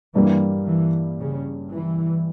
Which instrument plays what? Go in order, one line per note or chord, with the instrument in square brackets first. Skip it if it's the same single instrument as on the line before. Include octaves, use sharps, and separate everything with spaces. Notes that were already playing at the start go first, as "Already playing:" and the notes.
[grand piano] G2 G3 A#3 [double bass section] E3
[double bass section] E3
C#3
E3